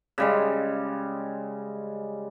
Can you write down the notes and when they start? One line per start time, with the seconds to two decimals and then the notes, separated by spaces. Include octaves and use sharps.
0.18 C#3 G3 G#3